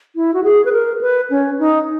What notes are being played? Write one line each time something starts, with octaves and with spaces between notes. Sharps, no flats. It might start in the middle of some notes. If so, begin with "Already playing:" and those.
E4
F#4
G#4
B4
A#4
B4
C#4
D#4